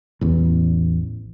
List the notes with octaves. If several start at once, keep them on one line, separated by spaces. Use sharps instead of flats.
A1 E2